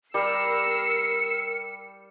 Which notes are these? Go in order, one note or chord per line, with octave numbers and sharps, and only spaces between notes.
G3 A#4 E6 C7 C#7